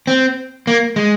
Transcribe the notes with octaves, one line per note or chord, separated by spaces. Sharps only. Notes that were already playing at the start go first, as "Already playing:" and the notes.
C4
A#3
G#3